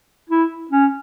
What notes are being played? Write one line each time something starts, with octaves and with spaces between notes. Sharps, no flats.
E4
C#4